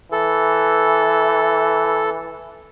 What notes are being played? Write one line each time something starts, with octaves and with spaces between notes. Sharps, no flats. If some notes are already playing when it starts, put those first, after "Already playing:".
E3 A4